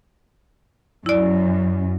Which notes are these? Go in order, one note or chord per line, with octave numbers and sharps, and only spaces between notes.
F#2 E4 D5